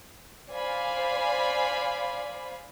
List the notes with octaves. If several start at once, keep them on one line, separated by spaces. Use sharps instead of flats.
C5 D5 F5 G#5 B5